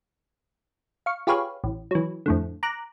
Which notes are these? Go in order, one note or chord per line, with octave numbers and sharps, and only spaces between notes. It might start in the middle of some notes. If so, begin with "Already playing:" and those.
F5 C#6
F4 G4 G#4 B4 C#5 F5
A1
E3 F#3
F2 A2 D3
A#5 D6 F#6